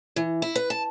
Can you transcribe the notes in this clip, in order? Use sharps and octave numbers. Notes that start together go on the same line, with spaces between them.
E3
E4
B4
A5